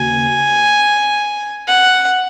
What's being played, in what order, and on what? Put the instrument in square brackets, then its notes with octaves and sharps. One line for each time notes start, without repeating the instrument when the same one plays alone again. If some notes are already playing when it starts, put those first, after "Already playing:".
Already playing: [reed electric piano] D#2 C#3 A#3 F#4 [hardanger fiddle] G#5
[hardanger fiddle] F#5